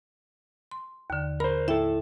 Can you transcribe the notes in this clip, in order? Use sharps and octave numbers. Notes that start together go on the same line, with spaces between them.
C6
D#2 D3
A#4 C5 B5
E4 A4 E5 G5